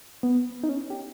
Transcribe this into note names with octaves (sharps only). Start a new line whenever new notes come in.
B3
D#4
C#4
G4